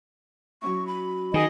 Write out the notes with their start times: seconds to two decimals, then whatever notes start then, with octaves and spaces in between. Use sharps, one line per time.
0.62 F#3 C#4 E4 C#6
0.87 B5
1.34 D#3 G#4 D#5